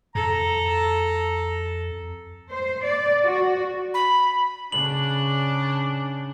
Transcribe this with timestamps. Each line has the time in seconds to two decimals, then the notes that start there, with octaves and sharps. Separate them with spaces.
0.15 F2 A4 A#5
2.51 C5
2.85 D5
3.25 F#4
3.94 B5
4.72 C#3 D4 F#7